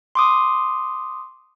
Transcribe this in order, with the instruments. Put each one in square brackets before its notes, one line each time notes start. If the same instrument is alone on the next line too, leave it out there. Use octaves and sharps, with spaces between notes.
[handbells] C6 D6 D#6